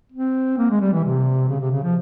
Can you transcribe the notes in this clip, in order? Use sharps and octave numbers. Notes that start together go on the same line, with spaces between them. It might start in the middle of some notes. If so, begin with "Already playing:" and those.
C4
A#3
G#3
G3
E3
C3
C#3
C3
C#3
F3